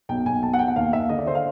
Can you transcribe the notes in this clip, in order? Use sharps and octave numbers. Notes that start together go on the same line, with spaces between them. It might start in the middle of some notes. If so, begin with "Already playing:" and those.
B1 G5
B1 G#5
B2 A5
F#5
B2 G5
F#5
D#2 F5
D#2 E5
D3 D#5
D5
D3 C5
F5